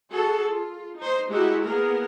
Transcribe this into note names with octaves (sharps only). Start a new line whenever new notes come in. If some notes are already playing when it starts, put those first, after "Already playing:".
F#4 G#4 A4
F4
D#4 C5
G#3 D#4 E4 F#4 G4
A#3 B3 G#4 A#4